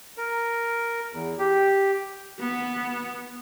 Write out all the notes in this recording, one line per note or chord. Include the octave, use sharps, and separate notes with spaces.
A#4
E2
G4
B3